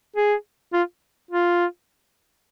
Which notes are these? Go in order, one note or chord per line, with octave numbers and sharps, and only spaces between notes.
G#4
F4
F4